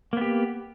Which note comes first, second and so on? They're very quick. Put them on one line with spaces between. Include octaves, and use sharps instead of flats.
A#3 B3 G4